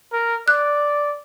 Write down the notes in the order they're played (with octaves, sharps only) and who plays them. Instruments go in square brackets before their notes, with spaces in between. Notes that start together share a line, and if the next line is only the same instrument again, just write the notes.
[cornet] A#4
[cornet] D5 [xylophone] F#6